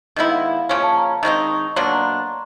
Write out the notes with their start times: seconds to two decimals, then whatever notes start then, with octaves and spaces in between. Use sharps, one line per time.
0.16 D#3 G#3 B3 E4 D#5
0.30 F5
0.69 C#3 F3 A#3 C#4 G#5
0.83 A5
0.97 A#5
1.10 B5
1.23 D#3 G#3 C4 D#4 C#6
1.50 C#6
1.76 B2 F#3 A#3 D4 C6
1.93 A#5
2.03 B5